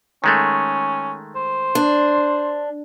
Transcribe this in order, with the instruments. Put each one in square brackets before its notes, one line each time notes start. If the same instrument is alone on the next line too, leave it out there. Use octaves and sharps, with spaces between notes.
[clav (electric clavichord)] D#3 G#3 A3 [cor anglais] C#4
[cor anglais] C5
[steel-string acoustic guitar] D4